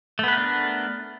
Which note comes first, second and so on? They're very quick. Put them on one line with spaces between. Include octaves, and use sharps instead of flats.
A3 B3 B4 A#4 D4